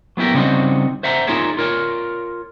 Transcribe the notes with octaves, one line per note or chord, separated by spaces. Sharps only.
F#3 B3 E4 G4 A#4
C#3 G3 B3 C4 D#4 F#4
C5 E5 F#5 A#5
D#4 F4 G#4 A#4 C#5 E5
F4 A#4 C#5